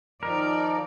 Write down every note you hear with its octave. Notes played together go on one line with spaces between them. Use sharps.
D#3 F3 D#4 A#4 D5